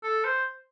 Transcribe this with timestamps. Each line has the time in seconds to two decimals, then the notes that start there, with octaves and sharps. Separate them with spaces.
0.03 A4
0.24 C5